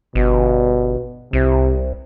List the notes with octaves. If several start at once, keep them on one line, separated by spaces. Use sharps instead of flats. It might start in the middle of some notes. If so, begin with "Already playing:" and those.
G1 B2
C2 C3